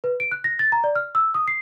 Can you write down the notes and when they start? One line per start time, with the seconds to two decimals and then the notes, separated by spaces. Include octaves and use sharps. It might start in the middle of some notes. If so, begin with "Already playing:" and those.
0.04 B4
0.20 D7
0.32 F#6
0.44 A#6
0.59 A6
0.72 A#5
0.84 D5
0.95 F6
1.15 E6
1.34 D#6
1.48 C7